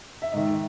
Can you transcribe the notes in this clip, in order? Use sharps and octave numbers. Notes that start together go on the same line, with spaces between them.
E5
G#2 D#3 D#5